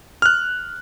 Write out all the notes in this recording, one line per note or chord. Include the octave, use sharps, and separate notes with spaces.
F6 F#6